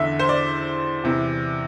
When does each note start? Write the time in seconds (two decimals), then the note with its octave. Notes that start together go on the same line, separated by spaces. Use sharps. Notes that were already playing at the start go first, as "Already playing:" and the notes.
Already playing: E2 D3 E5
0.19 C5
0.29 D5
1.03 E2 C3 E3